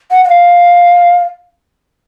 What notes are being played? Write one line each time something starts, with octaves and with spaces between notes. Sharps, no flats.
F#5
F#5
F5